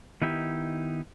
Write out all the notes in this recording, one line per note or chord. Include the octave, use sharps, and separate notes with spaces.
D#3 B3 D#4 E4 G4